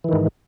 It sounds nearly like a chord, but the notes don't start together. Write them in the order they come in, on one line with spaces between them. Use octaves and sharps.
E3 D#3 G#2